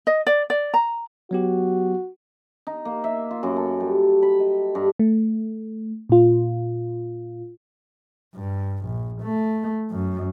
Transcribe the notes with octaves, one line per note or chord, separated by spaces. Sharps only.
D#5
D5
D5
A#5
F#3 B3 F#4 G4
D#4
A#3
E5
F4
F#2
A4
G3
B5
D#5
G2
A3
A#2 F4
G2
A#1
A3
F#2